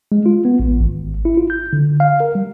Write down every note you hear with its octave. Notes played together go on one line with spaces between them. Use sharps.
G#3
F4
B3
A1
G#1
E4
F4
G6
D3
F5
A#4
G3